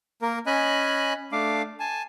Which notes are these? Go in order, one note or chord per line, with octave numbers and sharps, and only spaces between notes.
A#3 A#4
C#4 D#5 G#5 B5 F#6
A3 D4 F5 D6
G#5 A5